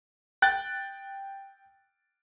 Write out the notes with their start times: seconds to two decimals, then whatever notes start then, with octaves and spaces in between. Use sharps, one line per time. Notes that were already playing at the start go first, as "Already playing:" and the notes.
0.42 G5 F#6 A6